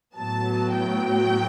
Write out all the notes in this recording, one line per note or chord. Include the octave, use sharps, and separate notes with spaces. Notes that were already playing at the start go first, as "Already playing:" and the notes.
A2 F#3 B3 A5
G5